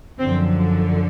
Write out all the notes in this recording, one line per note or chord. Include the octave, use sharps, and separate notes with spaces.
F#2 D3 F3 C4